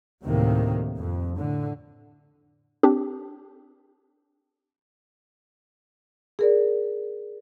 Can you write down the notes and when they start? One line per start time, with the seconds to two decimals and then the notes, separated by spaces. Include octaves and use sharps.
0.23 D2 A2 C3 D#3 A#3
0.98 F2
1.36 A2 D3
2.83 C4 D4 G4
6.39 G#4 A#4 D5